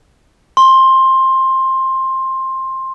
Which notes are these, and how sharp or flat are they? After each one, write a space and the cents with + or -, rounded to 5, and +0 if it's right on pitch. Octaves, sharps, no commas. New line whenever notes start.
C6 +15